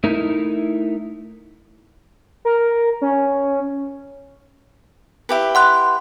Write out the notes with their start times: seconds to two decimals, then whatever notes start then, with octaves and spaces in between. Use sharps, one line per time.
0.04 A3 D#4 E4 A#4
2.45 A#4
3.02 C#4
5.29 E4 G4 B4
5.55 F#5 C6 F#6